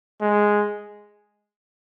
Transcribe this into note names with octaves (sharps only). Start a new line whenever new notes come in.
G#3